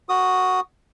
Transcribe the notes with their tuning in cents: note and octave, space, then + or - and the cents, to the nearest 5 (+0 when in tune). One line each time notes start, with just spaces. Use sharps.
F#4 +0 A#4 -20 D#6 +0